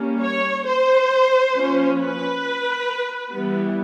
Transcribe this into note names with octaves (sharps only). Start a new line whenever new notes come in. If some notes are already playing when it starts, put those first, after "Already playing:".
Already playing: G3 A#3 C#4
C#5
C5
F3 A#3 C#4
B4
E3 G3 B3